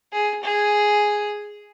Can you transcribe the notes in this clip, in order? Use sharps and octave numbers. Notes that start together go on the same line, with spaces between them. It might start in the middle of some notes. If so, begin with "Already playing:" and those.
G#4
G#4